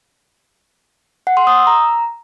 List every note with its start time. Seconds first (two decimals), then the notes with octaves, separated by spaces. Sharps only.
1.27 F#5
1.37 C6
1.47 D#6
1.57 E6
1.67 A#5